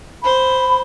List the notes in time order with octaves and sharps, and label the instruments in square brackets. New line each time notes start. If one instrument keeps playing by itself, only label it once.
[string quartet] C5 [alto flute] B5